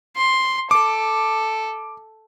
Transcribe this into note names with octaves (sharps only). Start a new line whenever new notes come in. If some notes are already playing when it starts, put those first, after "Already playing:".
C6
A4 D6